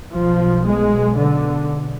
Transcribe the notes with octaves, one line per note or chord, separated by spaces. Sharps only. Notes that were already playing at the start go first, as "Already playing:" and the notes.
B1 B2 F3
G#3
D3